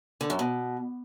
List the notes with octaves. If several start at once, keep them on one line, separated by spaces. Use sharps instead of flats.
D3
F#2
B2